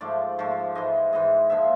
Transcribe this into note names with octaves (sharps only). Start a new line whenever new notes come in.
G#2 F3 A3 D5
G#2 F3 A3
G#2 E3 G#3 D#5
G#2 E3 G#3 D#5
A#2 F3 G#3 E5